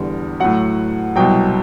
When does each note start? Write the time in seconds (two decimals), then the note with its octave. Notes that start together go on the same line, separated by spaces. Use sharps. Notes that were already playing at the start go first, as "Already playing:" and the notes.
Already playing: E2 D3 G3
0.40 A2 F#3 F#5
1.16 C2 B2 F#3 G5